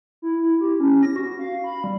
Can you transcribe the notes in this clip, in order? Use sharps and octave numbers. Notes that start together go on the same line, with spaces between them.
E4
E4
G4
C#4
A#6
F#4
F5
B5
G3